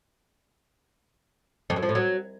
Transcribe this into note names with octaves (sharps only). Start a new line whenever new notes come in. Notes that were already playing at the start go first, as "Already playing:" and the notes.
F2
F#2
F3
A2
F#3